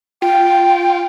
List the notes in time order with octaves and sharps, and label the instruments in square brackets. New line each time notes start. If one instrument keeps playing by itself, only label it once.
[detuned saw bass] F4 [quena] G5